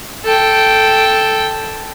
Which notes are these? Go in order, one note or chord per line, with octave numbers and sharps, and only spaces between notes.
A4 G5